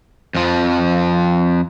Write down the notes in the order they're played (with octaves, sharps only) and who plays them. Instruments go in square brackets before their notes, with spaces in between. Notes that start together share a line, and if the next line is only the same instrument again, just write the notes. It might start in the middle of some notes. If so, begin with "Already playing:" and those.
[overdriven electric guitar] F2 F3